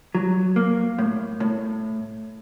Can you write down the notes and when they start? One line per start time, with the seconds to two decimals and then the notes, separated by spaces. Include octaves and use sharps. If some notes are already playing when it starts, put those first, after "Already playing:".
0.15 F#3
0.56 A#3
0.98 A2
1.40 A2